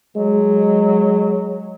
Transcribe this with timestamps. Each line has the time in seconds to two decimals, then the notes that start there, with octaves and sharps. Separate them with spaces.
0.17 F#3 G#3